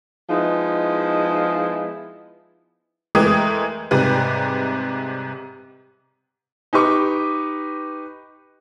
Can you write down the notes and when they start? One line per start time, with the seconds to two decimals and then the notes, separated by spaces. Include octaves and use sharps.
0.29 F3 G#3 B3 D#4 E4
3.15 E3 G#3 A3 A#4 G5 D#6
3.91 G#2 C3 G3 B4
6.73 D#4 G4 B4 C#6 D6